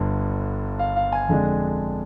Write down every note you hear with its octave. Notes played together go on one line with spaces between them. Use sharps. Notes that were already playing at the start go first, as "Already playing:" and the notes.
Already playing: G1 G2 D3
F5
F5
G#5
F2 D3 G#3 D4